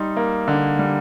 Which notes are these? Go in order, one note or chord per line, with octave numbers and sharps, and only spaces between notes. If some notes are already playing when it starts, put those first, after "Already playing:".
Already playing: G3 D#4 C6
A#3
D3
G3